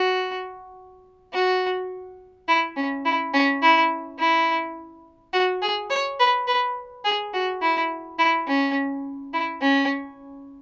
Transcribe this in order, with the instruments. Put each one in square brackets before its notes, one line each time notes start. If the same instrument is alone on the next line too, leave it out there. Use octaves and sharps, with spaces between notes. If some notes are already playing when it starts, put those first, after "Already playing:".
Already playing: [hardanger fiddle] F#4
F#4
E4
C#4
E4
C#4
E4
E4
F#4
G#4
C#5
B4
B4
G#4
F#4
E4
E4
C#4
E4
C#4